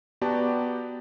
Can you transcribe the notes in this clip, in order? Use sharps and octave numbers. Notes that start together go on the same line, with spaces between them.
B3 F#4 G4 D5 A5 A#5